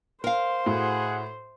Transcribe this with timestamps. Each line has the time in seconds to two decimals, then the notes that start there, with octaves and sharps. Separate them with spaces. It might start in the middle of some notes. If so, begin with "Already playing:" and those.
0.24 A#4 C5 F5
0.66 A2 F#4 G#4 F#5